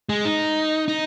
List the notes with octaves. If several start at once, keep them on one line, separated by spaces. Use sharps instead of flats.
G#3
D#4
D#4